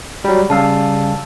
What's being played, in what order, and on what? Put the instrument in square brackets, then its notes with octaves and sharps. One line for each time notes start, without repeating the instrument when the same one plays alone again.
[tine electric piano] F#3 G3
[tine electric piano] C#3 G3 F5 [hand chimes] A5 E6